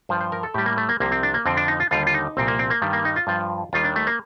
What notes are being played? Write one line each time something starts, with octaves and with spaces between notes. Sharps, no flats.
G2 F3 C5
C5
A#4
A4
A2 G3 G4
A#3
A3
A#3
C2 C3 F3 A#3
C4
D4
A#3
F2 D3 F3 C4
D4
D#4
F4
D#2 D3 G3 F4
F4
D#4
C2 A#2 F3 C4
A#3
C4
A#3
G2 D#3 G3
A#3
D#4
F4
G2 F3
D#2 D#3 G3 F4
D4
A3
A#3